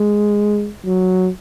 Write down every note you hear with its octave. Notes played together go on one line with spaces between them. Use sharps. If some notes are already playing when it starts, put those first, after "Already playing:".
Already playing: G#3
F#3